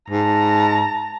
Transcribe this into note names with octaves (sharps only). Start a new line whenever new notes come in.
G#2 A5 A#5